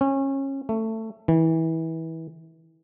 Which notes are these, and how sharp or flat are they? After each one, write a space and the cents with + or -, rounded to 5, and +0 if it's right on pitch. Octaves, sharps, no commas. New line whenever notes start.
C#4 -25
A3 +15
E3 -25